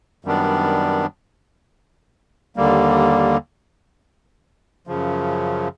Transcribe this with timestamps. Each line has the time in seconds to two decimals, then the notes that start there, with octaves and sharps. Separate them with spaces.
0.25 F#2 D#3 G3 B3 D4
2.56 D#2 D3 G3 A#3
4.87 F#2 C#3 F3